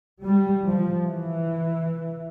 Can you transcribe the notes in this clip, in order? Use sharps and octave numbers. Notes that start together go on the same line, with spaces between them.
G3
F3
E3